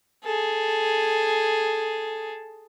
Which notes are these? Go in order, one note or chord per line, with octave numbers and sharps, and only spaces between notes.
G#4 A4